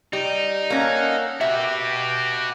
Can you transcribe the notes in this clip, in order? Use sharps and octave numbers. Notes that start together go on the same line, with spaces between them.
G3 D#4
A#3 C#4 A4 F5 F#5
F#4 G4 B4 E5